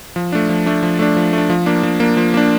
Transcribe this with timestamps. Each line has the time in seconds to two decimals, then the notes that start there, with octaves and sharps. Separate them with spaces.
0.16 F3
0.32 A3 D4
0.49 F3
0.66 A3 D4
0.83 F3
0.99 A3 D4
1.16 F3
1.33 A3 D4
1.50 F3
1.66 A#3 D4
1.83 F3
2.00 A#3 D4
2.17 F3
2.34 A#3 D4